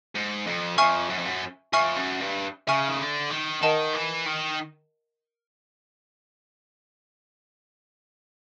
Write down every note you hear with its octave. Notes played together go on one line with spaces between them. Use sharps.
G#2
F2
F2 E5 G#5 C#6 F6
F#2
F2
F#2
F2 E5 G#5 C#6 F6
F#2
G2
C#3 E5 G#5 C#6 F6
D#3
D3
D#3
D#3 A#4 D#5 F#5 A5
E3
D#3